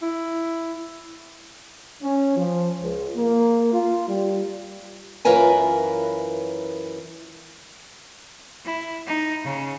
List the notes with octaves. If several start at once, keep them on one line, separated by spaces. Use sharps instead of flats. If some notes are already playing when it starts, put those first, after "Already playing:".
E4
C#4
F3
C#2
A#3
F4
G3
F#2 E3 F4 A#4 B4 G#5
E4
D#4
C#3